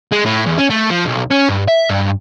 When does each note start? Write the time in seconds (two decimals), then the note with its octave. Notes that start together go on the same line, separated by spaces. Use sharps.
0.12 G#3
0.25 A2
0.46 E2
0.58 C#4
0.70 A3
0.90 F3
1.05 B1
1.31 C#4
1.49 G2
1.68 E5
1.90 G2